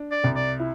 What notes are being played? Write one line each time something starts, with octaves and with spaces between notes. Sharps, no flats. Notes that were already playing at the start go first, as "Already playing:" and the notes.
Already playing: D4
D5
C2
D5
E4